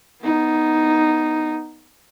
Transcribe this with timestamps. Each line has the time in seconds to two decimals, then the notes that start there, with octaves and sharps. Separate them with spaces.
0.23 B3 D#4